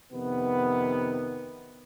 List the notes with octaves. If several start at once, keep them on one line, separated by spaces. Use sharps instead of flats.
F2 C3 D#3 B3